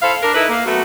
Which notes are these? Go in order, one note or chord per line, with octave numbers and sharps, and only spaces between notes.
E4 A4 C5 F5
D4 A#4
D#4 E4 A4 B4
A#3
F#3 A3 B3 F#4